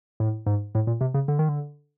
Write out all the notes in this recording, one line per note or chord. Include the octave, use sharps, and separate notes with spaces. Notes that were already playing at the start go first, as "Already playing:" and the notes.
A2
G#2
A2
A#2
C3
C#3
D3
D#3
D3